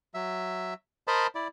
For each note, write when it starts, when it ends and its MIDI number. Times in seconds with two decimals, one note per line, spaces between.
0.14 0.74 54
0.14 0.74 76
1.08 1.27 70
1.08 1.27 72
1.08 1.27 75
1.08 1.27 81
1.08 1.27 83
1.35 1.48 64
1.35 1.48 74